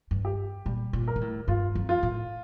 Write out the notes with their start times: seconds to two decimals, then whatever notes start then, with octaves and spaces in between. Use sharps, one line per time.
0.11 G2
0.25 G4
0.66 A#2 G3
0.93 A#2
1.08 A#4
1.16 A#2
1.21 A2
1.48 G2 F4
1.75 F2
1.89 F4
2.03 A2